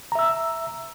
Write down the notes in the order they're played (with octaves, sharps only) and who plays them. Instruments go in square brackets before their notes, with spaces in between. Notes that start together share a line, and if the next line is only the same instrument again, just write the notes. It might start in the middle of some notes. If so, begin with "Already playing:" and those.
[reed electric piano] A#5
E5
E6